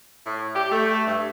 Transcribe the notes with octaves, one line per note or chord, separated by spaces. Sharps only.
A2
G4
A3
G2